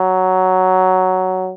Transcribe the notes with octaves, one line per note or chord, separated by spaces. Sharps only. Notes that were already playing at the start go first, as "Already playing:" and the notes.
Already playing: F#3